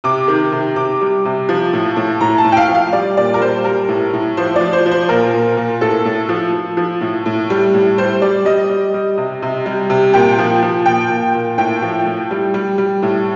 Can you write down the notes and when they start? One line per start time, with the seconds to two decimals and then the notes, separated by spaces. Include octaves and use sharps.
0.04 C3 D6
0.28 D#3
0.52 C3
0.76 C3 D6
1.01 G3
1.25 C3
1.49 F3
1.73 A2
1.96 A2
2.21 A2 A#5
2.38 A5
2.44 A2
2.52 G5
2.57 F5
2.69 F3
2.75 F5
2.93 G3 D5
3.17 A#2 D5
3.34 A#4
3.40 G3 C5
3.64 G3 A#4
3.88 A2
4.13 A2
4.37 F3 C5
4.56 F3 D5
4.73 C5
4.86 F3
4.91 C5
5.09 A#2 A#4
5.34 A#2
5.57 A#2
5.81 A2 A4
6.05 A2
6.29 F3
6.53 F3
6.77 F3
7.01 A2
7.26 A2
7.50 G3
7.74 A2
7.98 G3 C5
8.22 G3 D5
8.45 G3 D#5
8.70 G3
8.94 G3
9.18 C3
9.42 C3
9.66 G3
9.90 C3
10.14 A#2 G5
10.39 F3
10.63 F3
10.86 A#2 G5
11.09 A#2
11.35 A#2
11.58 A2 G5
11.82 F3
12.06 A2
12.31 G3
12.54 G3
12.78 G3
13.02 A2